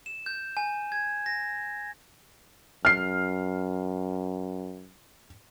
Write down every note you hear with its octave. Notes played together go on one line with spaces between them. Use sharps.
E7
G6
G#5
G#6
A#6
F#2 F6 C7